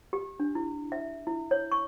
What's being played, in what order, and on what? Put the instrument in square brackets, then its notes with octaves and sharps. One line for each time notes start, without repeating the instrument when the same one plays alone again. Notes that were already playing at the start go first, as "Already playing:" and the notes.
[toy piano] G4
D4
E4
E5
E4
C#5
C#6